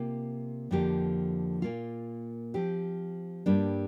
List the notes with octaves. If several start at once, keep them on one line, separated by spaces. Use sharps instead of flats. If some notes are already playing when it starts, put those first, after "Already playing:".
Already playing: C3 A#3 F4
F2 D3 F3 A#3 G4
A#2 A#3 F4
F3 C4 G4
G2 G3 A#3 D4